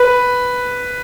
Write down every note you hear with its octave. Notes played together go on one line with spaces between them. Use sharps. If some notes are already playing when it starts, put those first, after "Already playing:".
Already playing: B4